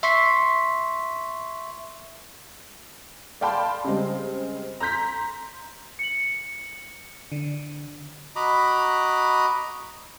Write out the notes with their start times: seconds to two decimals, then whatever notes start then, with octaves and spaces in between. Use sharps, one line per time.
0.03 E5 C6 C#6 B6 C7
3.41 D5 F5 G5 A5 B5 C6
3.84 C#3 G3 G#3 C4
4.80 A#5 C6 G6 B6
5.99 C#7 F#7
7.32 D3
8.36 F#4 D#5 A#5 B5 D6